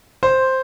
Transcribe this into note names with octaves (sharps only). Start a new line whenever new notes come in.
C5